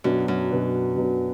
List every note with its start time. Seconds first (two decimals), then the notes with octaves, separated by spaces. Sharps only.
0.04 F#2 B2 F#3 B3 D4
0.28 F#2
0.51 B2 F#3 B3 D4
0.96 B2 F#3 B3 D4